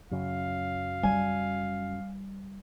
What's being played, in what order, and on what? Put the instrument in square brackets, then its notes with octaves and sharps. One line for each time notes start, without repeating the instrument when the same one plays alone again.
[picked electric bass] F#2 C#3 F#3 [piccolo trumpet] F5
[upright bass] G3 [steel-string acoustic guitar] G#5